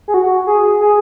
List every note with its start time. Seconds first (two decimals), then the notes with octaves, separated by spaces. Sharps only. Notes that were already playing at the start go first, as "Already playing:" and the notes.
0.08 G#4
0.14 F#4
0.47 G#4
0.81 G#4